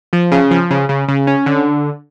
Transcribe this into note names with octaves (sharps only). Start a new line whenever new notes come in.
F3
C#3
F3
C#3
C#3
C#3
C#4
D3